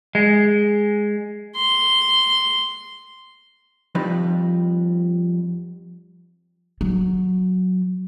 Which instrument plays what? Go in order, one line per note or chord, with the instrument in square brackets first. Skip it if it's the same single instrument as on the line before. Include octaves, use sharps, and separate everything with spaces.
[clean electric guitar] G#3
[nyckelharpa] C6
[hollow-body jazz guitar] F2 F3 G3 D#4 B4
[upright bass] F#3